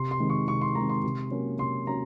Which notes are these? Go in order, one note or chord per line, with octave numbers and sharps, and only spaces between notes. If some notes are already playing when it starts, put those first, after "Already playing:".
Already playing: C3 C6
C6
D#3 G#3 C4
C#6
C3 C#6
C6
D#3 G#3 C4 A#5
C6
C3
F#3 A#3 C#4
C3 C6
F#3 A#3 C#4 A#5